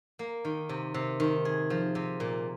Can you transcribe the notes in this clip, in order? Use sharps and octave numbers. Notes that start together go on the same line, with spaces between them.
A#3
D#3
C3
C3
D#3
G#4
F3
C3
A#2